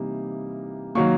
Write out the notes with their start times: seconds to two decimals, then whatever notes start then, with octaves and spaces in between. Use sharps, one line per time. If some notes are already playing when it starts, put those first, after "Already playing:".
Already playing: C3 E3 G3 A#3 D#4
0.95 D#3 F#3 A#3 C#6